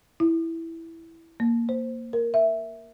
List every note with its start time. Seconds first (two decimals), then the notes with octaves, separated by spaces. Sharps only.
0.20 E4
1.40 A#3
1.69 C5
2.13 A#4
2.34 E5